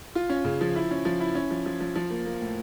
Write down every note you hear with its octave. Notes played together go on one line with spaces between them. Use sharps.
F4
C#4
C#3
F3
E4
C#4
F3
E4
C#4
F3
F3
F3
F3
A#3
A#3
A2